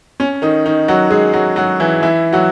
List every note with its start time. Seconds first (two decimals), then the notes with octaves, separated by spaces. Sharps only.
0.20 C#4
0.42 D#3 D#4
0.65 D#3 D#4
0.88 F#3 F#4
1.10 G#3 G#4
1.33 F#3 F#4
1.56 F#3 F#4
1.80 E3 E4
2.02 E3 E4
2.33 F#3 F#4